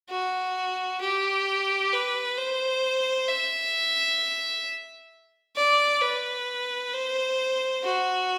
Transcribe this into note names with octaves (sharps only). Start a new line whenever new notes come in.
F#4
G4
B4
C5
E5
D5
B4
C5
F#4